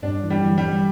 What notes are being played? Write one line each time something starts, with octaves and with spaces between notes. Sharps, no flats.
G2 G3 D4
E3
G3
E3
F#3
G3
E3